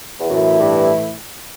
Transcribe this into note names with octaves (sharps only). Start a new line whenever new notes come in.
E2
F#2 A2 E3 A3 E4
G2